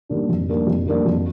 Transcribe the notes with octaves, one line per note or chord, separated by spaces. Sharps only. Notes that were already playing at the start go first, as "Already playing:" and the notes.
D#3 G3 A#3 D4
F2
D#3 G3 A#3 D4
F2
D#3 G3 A#3 D4
F2